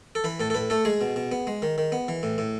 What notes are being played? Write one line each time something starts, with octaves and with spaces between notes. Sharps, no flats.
A4
E3 B4
A2 A4
A4
A2 B4
A3 A4
G#3 G#4
B2
B2
B3
G#3
D#3
D#3
B3
E3
A2
A2